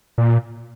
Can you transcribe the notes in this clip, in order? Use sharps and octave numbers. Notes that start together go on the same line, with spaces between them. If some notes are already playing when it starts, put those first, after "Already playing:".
A#2